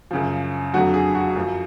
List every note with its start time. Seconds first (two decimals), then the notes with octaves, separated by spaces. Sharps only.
0.11 F#2 C#3 F3
0.73 F2 D3 F#3 F#4
0.94 G#4
1.15 F#4
1.36 F#2 F3